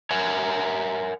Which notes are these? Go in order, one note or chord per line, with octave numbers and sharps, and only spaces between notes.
A#4 C#5 E5 F#5 G#5